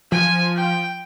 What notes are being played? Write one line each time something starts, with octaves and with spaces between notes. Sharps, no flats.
F3 G#5
G5